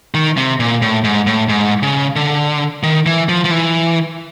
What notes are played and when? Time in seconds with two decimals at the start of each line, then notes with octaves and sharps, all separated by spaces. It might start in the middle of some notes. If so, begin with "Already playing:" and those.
0.14 D#3
0.37 C3
0.60 A#2
0.82 A2
1.04 G#2
1.27 A2
1.49 G#2
1.83 C#3
2.16 D3
2.83 D#3
3.06 E3
3.29 F3
3.45 F3
3.51 E3